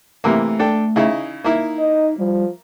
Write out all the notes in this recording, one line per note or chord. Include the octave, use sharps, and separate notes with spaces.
C3 E3 A3 A#3
D4 A4 G5
C#3 D#4 E4
A#3 D#4 E4
D#5
F3 G3